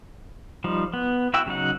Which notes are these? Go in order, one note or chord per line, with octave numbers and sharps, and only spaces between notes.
F3 G3 D#4
B3
E4 F#4 E5 G5 E6
C#3 F#3 D#4 F#5